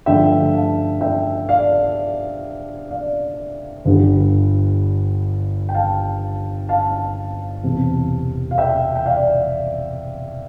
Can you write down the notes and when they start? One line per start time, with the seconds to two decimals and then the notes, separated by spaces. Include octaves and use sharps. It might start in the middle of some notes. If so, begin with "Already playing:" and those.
0.06 G2 D3 F3 A3 E5 G5
0.54 F5 A5
1.01 E5 G5
1.49 D5 F5
2.91 D5 F5
3.85 G1 G2 D3 G3
5.69 G5
5.74 F5 A5
6.69 F5 A5
7.63 E1 E2 C3 G3 C4
8.51 F5
8.58 E5 G5
8.95 G5
9.06 D5 F5